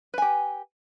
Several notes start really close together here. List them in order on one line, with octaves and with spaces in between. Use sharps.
B4 G#5 G4